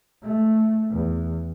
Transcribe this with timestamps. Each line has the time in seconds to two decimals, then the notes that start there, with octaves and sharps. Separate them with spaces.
0.23 A3
0.90 E2